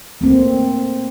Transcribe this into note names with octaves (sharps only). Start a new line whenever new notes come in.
A3 A#3 C4